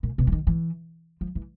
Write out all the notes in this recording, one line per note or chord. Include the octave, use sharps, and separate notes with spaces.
A#2
B2
E3
D#3
E3
F3
E3